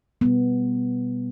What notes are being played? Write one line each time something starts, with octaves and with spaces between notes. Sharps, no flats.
B2 G3 B3